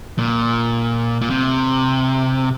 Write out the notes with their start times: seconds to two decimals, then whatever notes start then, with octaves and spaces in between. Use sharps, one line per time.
0.19 A#2
1.21 A#2
1.30 C3